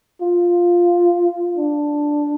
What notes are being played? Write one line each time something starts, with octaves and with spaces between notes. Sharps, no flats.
F4
D4